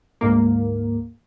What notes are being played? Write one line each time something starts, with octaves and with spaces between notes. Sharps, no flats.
D2 G#2 A#3